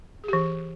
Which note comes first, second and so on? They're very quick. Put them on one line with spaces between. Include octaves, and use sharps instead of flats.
G#4 G4 E3